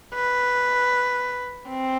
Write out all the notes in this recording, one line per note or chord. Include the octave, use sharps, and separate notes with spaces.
B4
C4